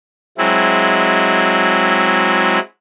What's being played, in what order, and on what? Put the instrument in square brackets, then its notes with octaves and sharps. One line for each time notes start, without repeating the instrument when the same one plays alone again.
[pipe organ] F#3 G#3 C4 E4